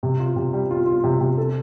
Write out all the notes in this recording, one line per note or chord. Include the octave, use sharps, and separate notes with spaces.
C3
F4
C3
G3
F4
F4
C3
C3
A4